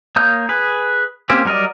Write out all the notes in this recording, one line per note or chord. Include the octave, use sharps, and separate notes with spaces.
A#3 C#5 A#5 D#6 G6
G#4 B4
A#3 C4 C#4 G4
F#3 G3 A#4 D5 D#5